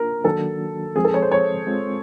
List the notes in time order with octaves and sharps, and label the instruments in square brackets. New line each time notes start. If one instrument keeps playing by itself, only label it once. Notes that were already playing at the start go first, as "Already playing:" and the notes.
Already playing: [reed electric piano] A#3 D4 F4 [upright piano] A#4
[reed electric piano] D#3 F#3 A#3 D4 F#4 [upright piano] A4
[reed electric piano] F3 G#3 C4 [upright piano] G#4
[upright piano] A4
C#5
C5
C#5
[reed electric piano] G#3 C4 F4